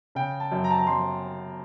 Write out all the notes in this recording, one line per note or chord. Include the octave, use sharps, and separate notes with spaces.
C#3 G5
A5
F#2
A#5
A5
A#5
F#2 C6